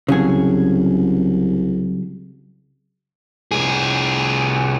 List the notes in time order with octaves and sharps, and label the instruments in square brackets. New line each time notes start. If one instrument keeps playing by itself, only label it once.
[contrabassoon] C2 [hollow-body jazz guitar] C#3 F#3 G#4
[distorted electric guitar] C2 G#4